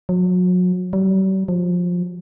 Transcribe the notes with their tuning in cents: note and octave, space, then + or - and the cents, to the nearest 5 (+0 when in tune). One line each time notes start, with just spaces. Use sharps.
F#3 -35
G3 -45
F3 +20